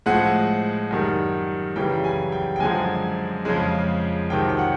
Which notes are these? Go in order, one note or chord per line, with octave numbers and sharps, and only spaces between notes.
A2 F3 G#3 F#5
F#2 D#3 G3
F#2 C#3 E3 G3 G5
G#5
G5
G5
F#2 D3 F3 G#3 G#5
F2 C#3 F3 G#3
F2 C3 D#3 F#3 G5
G5
F#5